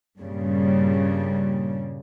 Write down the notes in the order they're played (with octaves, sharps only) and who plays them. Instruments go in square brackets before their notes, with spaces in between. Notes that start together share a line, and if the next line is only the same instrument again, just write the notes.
[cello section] G2 A#2 C#3 G3